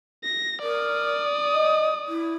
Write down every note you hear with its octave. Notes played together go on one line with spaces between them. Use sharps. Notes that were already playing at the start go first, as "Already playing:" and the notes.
A#6
A#4 D5 D#6
D#5
E4